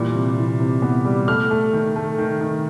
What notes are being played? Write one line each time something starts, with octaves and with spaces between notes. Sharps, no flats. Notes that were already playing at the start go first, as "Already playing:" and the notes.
Already playing: A#2 E3 G3
C3
E3
C3
B3
G3
A3 F6
A3
D#3
A3
D#3
D#3